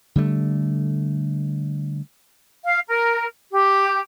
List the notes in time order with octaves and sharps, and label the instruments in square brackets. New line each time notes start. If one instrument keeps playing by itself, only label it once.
[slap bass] D3 G3 A3
[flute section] F5
A#4
G4